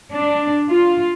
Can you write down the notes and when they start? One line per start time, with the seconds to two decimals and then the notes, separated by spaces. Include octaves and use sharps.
0.14 D4
0.70 F4